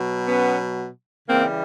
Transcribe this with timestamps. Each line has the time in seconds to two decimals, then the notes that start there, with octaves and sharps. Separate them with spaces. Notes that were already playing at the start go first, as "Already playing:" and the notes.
Already playing: B2 F#3
0.27 B3 C#4
1.29 C#3 E3 G3 A#3 C4